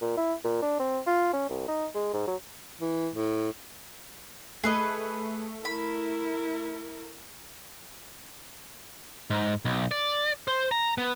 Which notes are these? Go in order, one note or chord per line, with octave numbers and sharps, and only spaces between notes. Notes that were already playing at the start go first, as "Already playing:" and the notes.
A#2
E4
A#2
D4
C4
F4
C#4
C2
D#4
G#3
G#2
F#3
E3
A2
A3 G#4 B4 D#5
E4 A#4 B5
G#2
B1
D5
C5
A#5
B3